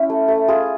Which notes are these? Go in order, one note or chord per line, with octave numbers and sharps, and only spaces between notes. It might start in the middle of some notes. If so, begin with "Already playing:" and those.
Already playing: C#4 E4
A3
A3
F4 G#4